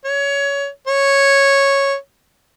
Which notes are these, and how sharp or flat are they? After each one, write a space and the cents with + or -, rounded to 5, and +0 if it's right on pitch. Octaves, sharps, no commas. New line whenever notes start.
C#5 +20
C#5 -5